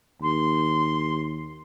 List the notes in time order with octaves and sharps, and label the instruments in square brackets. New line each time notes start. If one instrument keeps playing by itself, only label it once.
[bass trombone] D#2 [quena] C6